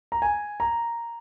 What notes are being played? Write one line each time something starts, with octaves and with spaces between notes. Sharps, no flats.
A#5
G#5
A#5